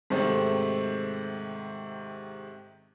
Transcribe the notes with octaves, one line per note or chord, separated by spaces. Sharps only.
G#2 C3 D#3 A3 C4